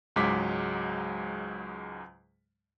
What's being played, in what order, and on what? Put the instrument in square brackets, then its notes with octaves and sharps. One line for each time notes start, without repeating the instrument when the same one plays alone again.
[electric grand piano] C#2 G#2 F#3 G#3 D6 B6